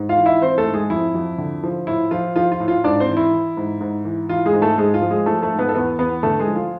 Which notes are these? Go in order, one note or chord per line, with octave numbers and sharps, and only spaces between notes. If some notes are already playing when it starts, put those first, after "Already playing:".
Already playing: G#2
F4 F5
E3
E4 E5
E3 C4 C5
A3 A4
G#2
G#3 G#4
F2 E4
F2
D3
F3
A2 E4
F3 F4
F3 F4
F4
A2
F4
G#2 D4 D5
C4 C5
E3
E4
E3
G#2
G#2
E3
E3 F4
G#3 G#4
G#2
A3 A4
G#2 G#3 G#4
F4
F3
G#3 G#4
F3 A3 A4
A3 A4
G#2
B3 B4
A4
E2 B3 B4
E2 B3 B4
D3 A3 A4
G#3 G#4
F3
F4